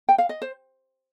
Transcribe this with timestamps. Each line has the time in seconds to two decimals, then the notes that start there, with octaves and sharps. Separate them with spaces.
0.09 G5
0.18 F5
0.29 D#5
0.42 C5